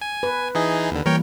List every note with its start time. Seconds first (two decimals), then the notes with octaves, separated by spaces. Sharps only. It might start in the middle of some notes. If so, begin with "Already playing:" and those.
0.02 G#5
0.23 B4
0.55 E3 D#4 G#4
0.91 D#2 D3
1.06 E3 G3 A#3 A#4 C#5 G5